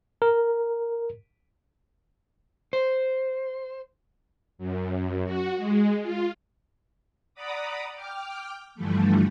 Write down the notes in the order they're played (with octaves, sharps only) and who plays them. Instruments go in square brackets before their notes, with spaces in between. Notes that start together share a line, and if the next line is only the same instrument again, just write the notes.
[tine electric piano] A#4
[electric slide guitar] C5
[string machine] F#2
F#4
G#3
F4
D5 F#5 A#5 B5 D6 D#6
G5 D6 F6
G2 D3 E3 F3 G3 A3